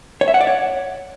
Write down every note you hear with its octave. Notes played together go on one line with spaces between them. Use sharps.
C#5
E5
F#5
D5
C#5